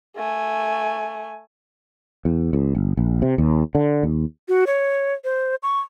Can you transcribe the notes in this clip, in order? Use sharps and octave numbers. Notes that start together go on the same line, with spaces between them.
A3 G#5
E2
C#2
G1
A#1
C3
D#2
D3
D#2
F#4
C#5
C5
C#6